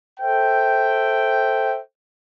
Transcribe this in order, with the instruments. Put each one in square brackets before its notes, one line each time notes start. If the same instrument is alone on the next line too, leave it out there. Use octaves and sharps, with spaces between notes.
[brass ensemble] A4 C5 E5 G5